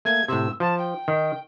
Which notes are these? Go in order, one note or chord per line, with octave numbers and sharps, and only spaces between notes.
A3 A#3 G#6
A2 C3 E6
F3 A5
G5
D#3